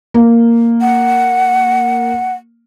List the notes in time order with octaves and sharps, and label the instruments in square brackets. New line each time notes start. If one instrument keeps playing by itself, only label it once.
[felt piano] A#3
[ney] F#5